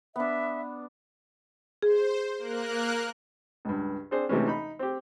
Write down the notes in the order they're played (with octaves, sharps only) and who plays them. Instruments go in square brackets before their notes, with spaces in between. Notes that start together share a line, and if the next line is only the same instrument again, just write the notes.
[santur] B3 D4 [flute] E5
[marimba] G#4 [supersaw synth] C5
[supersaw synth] A#3 A#4 F#6
[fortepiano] C#2 G2
C4 D4 G#4 C5
D2 C3 E3 G#3 C#4
D#4 B5
C4 G4